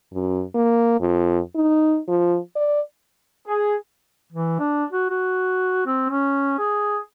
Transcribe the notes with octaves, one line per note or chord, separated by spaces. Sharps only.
F#2
A#3
F2
D#4
F3
D5
G#4
E3
D4
F#4
F#4
C4
C#4
G#4